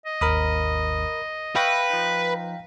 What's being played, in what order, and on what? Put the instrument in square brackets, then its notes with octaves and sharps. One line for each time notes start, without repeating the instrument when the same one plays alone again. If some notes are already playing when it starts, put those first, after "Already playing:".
[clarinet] D#5
[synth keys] G#1 D#2 [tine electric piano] A#4 B5 D#6
[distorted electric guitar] B4 [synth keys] E5 C#6 F#6 [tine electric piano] F5 G5 A#6
[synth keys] F3 D#4